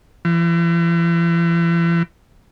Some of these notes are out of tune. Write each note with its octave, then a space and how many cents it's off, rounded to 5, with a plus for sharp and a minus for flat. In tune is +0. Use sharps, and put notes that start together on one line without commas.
E3 +40